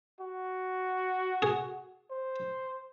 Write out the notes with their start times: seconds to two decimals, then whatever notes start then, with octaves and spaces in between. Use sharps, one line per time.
0.21 F#4
1.42 G#4
2.11 C5